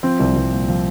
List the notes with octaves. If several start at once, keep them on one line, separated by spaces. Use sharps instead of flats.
F3 C4
C2
C2
A#2
F3